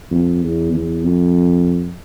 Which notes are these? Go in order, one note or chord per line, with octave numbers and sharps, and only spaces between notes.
F2
E2
E2
F2